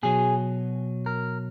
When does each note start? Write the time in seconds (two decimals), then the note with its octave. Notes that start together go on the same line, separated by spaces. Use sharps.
0.03 B2 F#3 G#4
1.06 A#4